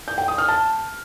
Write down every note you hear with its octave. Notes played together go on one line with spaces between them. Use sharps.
G6
G5
D#6
F6
A5